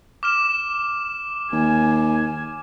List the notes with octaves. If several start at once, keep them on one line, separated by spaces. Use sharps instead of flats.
D6 F6 E7
D#2 G#5